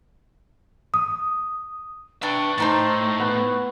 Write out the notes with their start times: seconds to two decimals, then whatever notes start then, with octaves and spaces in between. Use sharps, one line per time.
0.94 D#6
2.22 D4 B4 E5 G5 C#6
2.58 A2 A3 C4 D#4 A5
3.20 B3